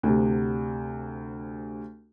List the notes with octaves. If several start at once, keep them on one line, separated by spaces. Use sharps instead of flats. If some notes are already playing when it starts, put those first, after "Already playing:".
D2 C3